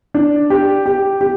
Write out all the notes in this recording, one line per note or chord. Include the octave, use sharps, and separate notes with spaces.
D4
G4
G4
G4